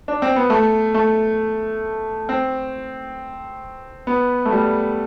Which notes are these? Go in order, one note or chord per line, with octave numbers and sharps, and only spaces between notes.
D4
C4
B3
A3
A3
C4
B3
A3
G3